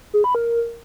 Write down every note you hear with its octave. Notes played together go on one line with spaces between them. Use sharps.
G#4
B5
A#4